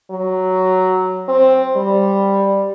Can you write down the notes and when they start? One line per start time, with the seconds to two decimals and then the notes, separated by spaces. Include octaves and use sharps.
0.11 F#3
1.29 C4
1.76 G3